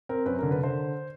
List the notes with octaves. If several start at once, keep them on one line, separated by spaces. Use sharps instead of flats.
C4 A#4
F#2 B4
A#4
D3
B4
D3 C5